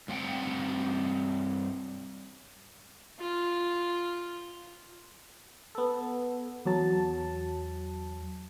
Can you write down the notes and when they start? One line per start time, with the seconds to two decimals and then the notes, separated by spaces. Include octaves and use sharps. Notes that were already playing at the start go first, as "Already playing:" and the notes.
0.08 G2 C4 F#5 G5
3.20 F4
5.75 B3 A4
6.65 E2 F#3 A5